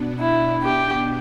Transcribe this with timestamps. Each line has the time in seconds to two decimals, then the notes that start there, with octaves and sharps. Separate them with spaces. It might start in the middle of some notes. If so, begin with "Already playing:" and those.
Already playing: B2 B3 D4
0.19 E4
0.62 G4